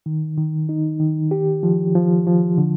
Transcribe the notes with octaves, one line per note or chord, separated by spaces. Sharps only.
D#3
D#3
D#4
D#3
G4
F3
F3
F3
D3